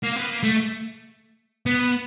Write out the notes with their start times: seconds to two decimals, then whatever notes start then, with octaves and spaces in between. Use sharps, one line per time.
0.03 A#3
0.16 B3
0.29 A#3
0.43 A3
1.66 B3